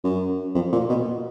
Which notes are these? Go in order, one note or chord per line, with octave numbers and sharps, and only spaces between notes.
F#2
F2
A#2
B2